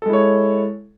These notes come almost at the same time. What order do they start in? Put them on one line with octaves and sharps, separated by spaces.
A4 G#3 E4 C#5